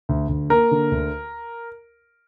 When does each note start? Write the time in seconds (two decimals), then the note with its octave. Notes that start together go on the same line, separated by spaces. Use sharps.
0.09 D2
0.29 D2
0.50 A#3 A#4
0.71 D3
0.92 D2